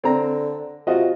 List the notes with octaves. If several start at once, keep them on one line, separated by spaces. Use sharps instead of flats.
D3 C4 A#5
C3 F4 F#4 D#5